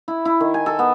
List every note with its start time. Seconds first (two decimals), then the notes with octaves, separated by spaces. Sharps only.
0.08 E4
0.25 E4
0.40 D#3
0.54 G#5
0.66 A4
0.79 B3